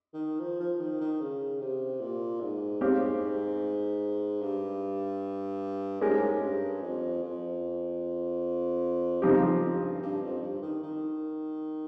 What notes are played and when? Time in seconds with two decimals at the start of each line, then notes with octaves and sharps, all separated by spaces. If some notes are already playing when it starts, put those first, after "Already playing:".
0.14 D#3
0.40 F3
0.60 F3
0.80 D#3
1.01 D#3
1.21 C#3
1.61 C3
2.01 A#2
2.41 G#2
2.81 C4 G4 C#5 F5
4.41 G2
6.01 G#2 G#3 C#4 G4 A#4
6.42 G2
6.81 F2
7.22 F2
9.22 G2 C#3 F3 C4 D#4 G4
9.49 F2
9.75 G2
10.02 G2
10.23 F2
10.42 G2
10.62 D#3
10.83 D#3